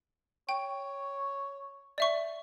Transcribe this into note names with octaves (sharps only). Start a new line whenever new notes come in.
C#5 G5
D5 E5 C#6